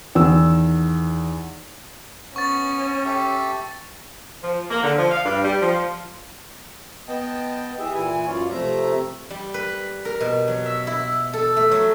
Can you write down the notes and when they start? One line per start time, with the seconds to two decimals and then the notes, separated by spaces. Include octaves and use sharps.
0.15 E2 D#3 E6
2.36 B3 C#4 C#6 A6
3.05 G4 A4 E5
4.43 F3
4.70 A#3
4.83 D3
4.98 F3
5.12 F5
5.25 G2
5.45 G3
5.62 F3
7.08 B3 D#5 G5 A5
7.79 E3 G4 G#4 E5
7.94 A#2 E3 E4 G#5
8.26 F#2 F4 C#5 D5
8.51 C3 F3 A3 E5 A#5
9.30 G3
9.54 B4
10.05 A#4
10.20 B2
10.48 F#3
10.66 E5
10.87 E4
11.33 A4
11.57 A3
11.71 F#3